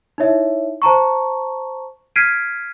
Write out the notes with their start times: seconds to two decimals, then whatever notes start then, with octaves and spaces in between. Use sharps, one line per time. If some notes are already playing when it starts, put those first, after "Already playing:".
0.18 D#4 E4 C#5 E5
0.82 C5 A5 A#5 C#6
2.16 F6 G#6 B6 C7 D7 D#7